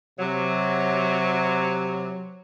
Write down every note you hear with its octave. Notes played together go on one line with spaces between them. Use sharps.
C3 F#3